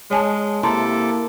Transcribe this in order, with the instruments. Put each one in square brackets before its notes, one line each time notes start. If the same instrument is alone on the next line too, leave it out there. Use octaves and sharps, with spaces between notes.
[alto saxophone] G#3 [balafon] C#5 G#5 A5
[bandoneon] C3 A4 D6 [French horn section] A#3 [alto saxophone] E4 [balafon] A5 A#5 C6